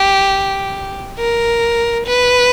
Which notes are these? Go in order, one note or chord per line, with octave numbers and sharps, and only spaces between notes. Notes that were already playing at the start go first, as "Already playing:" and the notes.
Already playing: G4
A#4
B4